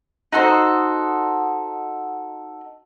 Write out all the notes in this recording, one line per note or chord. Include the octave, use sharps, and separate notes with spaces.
D#4 F#4 A4 C5